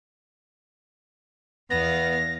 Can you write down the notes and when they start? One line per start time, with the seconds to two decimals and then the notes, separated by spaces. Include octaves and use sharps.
1.70 E2 B3 F5 A#6